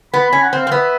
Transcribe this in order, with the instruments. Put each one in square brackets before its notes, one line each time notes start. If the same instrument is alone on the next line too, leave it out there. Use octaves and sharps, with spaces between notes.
[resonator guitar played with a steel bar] B3 [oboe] B5
[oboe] B5
[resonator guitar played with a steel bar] C#4
[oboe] F#5
[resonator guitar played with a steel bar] C4 [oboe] F5
[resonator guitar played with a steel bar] C4
[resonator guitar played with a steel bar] B3 [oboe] E5